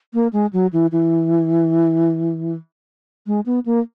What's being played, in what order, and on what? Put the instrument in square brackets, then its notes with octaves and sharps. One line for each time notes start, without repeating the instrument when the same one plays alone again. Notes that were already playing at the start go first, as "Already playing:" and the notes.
[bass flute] A#3
G#3
F#3
E3
E3
G#3
B3
A#3